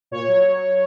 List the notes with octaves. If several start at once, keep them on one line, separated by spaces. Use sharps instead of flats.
A#2 C#5
F#3